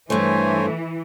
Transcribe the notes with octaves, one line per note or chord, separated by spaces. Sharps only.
G2 E3 A3 C5 C#5 G#5